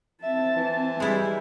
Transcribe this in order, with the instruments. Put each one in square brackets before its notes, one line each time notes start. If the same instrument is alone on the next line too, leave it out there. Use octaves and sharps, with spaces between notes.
[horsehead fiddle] C4 A5 [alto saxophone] E5
[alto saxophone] E3
[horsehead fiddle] G3 [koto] G#3 E4